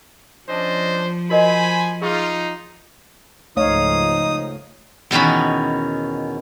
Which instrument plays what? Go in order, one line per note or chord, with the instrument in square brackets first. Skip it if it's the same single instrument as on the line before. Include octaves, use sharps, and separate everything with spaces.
[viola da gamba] F3 [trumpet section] C#4 D4 D#5 [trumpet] C5
[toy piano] F#4 A#4 D#5 [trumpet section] C5 G#5 [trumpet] B5
[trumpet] D#4 [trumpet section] F4 [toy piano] G#4 D6
[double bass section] C#2 G#2 F3 [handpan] A3 C#5 F5 [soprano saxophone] D#4 [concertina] D#6
[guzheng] E2 B2 D#3 C#4 B5